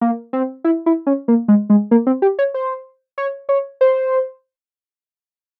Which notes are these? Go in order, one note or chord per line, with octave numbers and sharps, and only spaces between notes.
A#3
C4
E4
E4
C#4
A#3
G#3
G#3
A#3
C4
G4
C#5
C5
C#5
C#5
C5